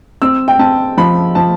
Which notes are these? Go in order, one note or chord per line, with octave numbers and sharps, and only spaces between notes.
C4 E6
G5
C4 A5
F3 B5
F3 A5